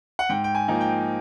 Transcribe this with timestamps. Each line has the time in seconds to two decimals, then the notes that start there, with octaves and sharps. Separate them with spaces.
0.19 F#5
0.29 G#2 G5
0.44 G5
0.55 G#5
0.68 F3 A#3 D#4
0.81 G5